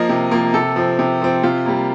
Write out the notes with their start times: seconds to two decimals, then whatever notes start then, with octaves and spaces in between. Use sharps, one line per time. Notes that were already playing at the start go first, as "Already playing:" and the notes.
Already playing: F3 A#3 D#5
0.09 C3
0.31 F3 A#3
0.54 C3 A4
0.76 F3 C4
0.99 C3
1.21 F3 C4
1.43 C3 F4
1.66 G3 A#3